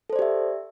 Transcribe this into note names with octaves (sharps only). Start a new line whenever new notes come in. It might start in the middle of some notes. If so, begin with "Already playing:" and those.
G4 A4 C5 D5 E5